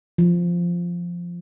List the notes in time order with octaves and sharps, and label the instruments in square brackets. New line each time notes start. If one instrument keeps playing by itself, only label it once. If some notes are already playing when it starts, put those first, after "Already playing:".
[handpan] F3